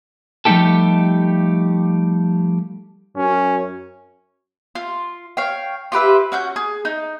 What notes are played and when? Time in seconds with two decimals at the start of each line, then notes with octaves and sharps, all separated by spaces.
0.45 F3 G3 A3 D#4 G4 A4
3.16 F#2 C#4
4.75 F4
5.37 C#5 F5 G5
5.92 F4 G4 B4 E5
6.32 C#4 F#4 G6
6.56 G#4
6.85 D#4